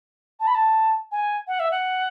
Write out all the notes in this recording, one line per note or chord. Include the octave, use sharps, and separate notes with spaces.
A5
B5
A5
G#5
F#5
E5
F#5